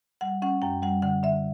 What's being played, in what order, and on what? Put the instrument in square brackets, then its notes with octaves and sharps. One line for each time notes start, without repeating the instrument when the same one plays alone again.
[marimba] G3 F#5
C#4 F#5
F#2 G5
G3 F#5
D3 F#5
D3 E5